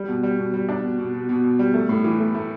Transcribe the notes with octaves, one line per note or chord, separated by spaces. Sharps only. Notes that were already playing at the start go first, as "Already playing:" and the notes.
Already playing: G3
B2
G3
B2
G3
D4
B2
B2
B2
B2
B2
G3
A3
A2
E3
A3
A3